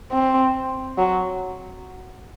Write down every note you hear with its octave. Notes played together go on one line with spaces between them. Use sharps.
C4
F#3